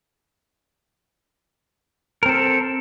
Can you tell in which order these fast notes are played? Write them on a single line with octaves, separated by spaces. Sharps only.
A#4 C4 A4